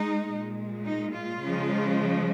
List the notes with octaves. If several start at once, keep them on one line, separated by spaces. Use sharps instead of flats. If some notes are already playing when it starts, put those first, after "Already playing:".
Already playing: G#3 D#4
A#2 G#3
D#4
F4
C#3 F3 G#3